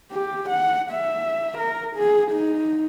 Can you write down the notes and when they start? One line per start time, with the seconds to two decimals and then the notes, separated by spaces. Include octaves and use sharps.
0.12 G4
0.49 F#5
0.91 E5
1.58 A#4
1.96 G#4
2.32 D#4